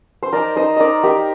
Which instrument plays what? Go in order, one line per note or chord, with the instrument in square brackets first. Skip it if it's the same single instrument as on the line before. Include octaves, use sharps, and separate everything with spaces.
[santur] C5
D#4 A#4 D5
D#4 C5 D#5
D#4 A#4 D5 D#5
D#4 G4 A#4